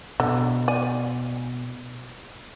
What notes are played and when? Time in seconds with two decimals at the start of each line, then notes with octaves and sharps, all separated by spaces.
0.20 B2 D3
0.68 D5 G#5